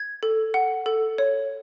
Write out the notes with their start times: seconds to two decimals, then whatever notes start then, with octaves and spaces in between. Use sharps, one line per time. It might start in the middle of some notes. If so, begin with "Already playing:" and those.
Already playing: G#6
0.23 A4
0.54 F#5
0.86 A4
1.18 C#5